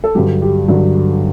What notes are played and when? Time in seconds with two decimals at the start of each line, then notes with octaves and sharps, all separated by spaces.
0.04 A4
0.15 G2 D3 F#3 G4
0.42 G4
0.68 G2 D3 F#3